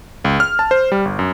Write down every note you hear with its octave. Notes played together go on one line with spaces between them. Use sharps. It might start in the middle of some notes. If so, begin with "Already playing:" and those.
C#2
F6
A5
C5
G3
G1
F#2